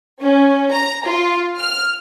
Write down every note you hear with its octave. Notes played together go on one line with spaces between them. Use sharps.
C#4
A#5
F4
F6